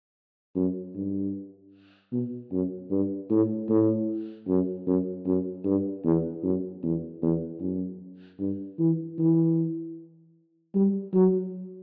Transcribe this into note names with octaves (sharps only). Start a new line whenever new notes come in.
F#2
G2
B2
F#2
G2
A2
A2
F#2
F#2
F#2
G2
E2
F#2
E2
E2
F#2
G2
E3
E3
G3
F#3